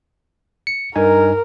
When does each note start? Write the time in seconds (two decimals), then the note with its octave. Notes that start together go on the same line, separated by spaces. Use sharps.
0.67 C#7
0.96 G2 D#4 A#4 G#5